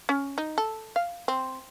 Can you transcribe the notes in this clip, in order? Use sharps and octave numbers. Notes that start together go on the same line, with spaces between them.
C#4
D#4
A4
F5
C4